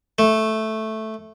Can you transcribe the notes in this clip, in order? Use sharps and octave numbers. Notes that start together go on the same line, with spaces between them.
A3